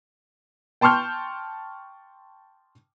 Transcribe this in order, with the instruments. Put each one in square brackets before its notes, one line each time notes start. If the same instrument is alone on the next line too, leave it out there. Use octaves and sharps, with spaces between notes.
[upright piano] G5 A5 C6 C#6 F6 G6